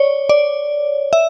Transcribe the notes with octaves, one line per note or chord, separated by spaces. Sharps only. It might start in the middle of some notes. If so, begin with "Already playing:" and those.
Already playing: C#5 D5
D5
E5